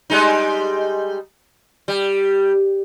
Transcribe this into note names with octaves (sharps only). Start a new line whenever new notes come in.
G3 G#3 D#4
G3